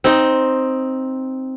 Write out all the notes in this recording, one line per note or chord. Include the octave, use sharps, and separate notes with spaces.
C4 D#4